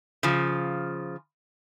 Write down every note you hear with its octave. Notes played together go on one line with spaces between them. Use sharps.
C#3 F3